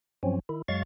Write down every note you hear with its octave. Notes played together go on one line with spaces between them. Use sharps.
G2 F3 F#3 C4 C#4
D#3 E4
F#2 F#3 G#3 F5 C#6 A6